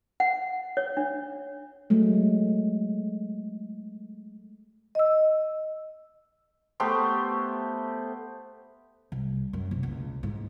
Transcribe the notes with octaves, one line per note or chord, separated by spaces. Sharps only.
F#5
C#5
D4
F#3 G#3 A3
D#5 E6
A3 B3 G4 C5
C2
F#2
C3
C#2
G#2